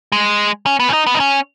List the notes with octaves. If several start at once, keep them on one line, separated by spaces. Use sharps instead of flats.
G#3
C#4
B3
C#4
D#4
B3
D#4
C#4